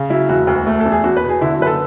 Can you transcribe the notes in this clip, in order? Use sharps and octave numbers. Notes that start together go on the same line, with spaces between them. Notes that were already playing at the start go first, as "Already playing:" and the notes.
Already playing: C#3
F#3 E4
E1 F#4
D2
A3
E2 A4
G#4
E2 F#4
B4
B2
G#4
D3 E4
F#4
F#1 B4
A4